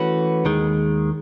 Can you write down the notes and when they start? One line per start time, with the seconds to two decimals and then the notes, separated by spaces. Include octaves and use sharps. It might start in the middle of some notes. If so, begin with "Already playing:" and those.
Already playing: E3 A3 C#4 F#4 B4
0.45 D#2 D#3 G#3